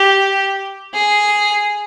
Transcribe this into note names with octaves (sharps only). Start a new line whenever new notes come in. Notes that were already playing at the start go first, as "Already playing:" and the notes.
Already playing: G4
G#4